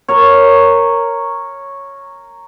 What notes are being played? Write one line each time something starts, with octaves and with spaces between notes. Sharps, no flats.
A#4 C#5